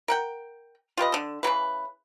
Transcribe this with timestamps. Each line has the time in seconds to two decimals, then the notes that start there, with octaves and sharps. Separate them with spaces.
0.08 A#4 F#5 G5
0.97 F4 G4 B4 D#5
1.12 D3 A4
1.43 C#3 E3 F#3 B4